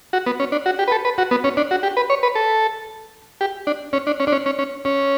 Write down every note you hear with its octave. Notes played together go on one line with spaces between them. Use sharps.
F#4
B3
C#4
D4
F#4
G4
B4
A4
B4
F#4
B3
C#4
D4
F#4
G4
B4
C#5
B4
A4
G4
D4
C#4
D4
C#4
D4
C#4
C#4
C#4
C#4